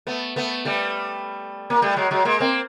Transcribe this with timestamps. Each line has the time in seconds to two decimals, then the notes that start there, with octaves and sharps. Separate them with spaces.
0.07 A3 B3
0.36 A3 B3
0.65 G3 A3
1.70 A#3
1.82 G3 A3
1.96 F#3 G#3
2.11 F#3 G#3
2.25 G#3 A#3
2.40 A#3 C4